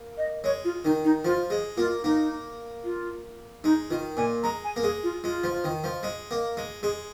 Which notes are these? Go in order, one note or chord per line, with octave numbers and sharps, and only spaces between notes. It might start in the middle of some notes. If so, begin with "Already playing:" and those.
Already playing: A#3
D#5
G#3 C#5
F4
D#3 D#4
D#4
F3 F4
G#3 G#4
A#3 F4
A#3 D#4
F4
G#3 D#4
D#3 F4
A#2 G#5
G#3 A#5
G#5
A#3
G#3 G#4
F4
G#3 F4
F3
D#3
F3
G#3
A#3
G#3
G#3 G#4